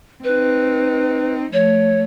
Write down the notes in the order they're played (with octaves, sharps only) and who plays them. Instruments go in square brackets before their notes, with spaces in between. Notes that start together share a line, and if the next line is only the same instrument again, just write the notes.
[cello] C4 D#4 [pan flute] B4
[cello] F3 A3 [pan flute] C#5